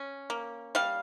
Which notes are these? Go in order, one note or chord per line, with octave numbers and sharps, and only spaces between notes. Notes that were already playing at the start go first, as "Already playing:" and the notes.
Already playing: C#4
A#3
G3 F5